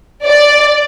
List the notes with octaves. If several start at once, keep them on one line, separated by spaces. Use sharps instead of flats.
D5